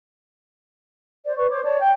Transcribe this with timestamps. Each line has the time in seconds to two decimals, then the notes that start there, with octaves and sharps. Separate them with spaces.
1.25 C5 D5
1.37 B4 D5 C#6
1.50 C5 C#5 D6
1.64 C#5 D5 A5
1.80 G5 G6